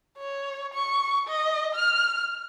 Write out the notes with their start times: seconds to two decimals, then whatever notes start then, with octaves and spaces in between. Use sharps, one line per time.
0.18 C#5
0.75 C#6
1.27 D#5
1.75 F6